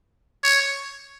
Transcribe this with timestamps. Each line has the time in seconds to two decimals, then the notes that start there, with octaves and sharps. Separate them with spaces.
0.44 C#5